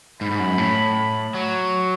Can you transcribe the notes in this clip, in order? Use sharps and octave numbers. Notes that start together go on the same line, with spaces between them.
G#2 B5
G#2
F#2
A2
F#3 C#6